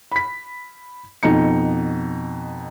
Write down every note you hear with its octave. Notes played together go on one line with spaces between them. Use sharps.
B5 B6
F2 B2 D#4 C#7